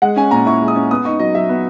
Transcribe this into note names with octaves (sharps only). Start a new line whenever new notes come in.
G#3 F#5
C#4 G#5
A#2 A#5
E4 C#6
G#3
D#6
C#4
B3 D#6
D#4 C#6
F#3 D#5
F#3 E5
B3